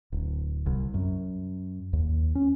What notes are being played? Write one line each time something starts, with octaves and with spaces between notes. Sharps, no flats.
D1
C2
F#2
D#2
C#4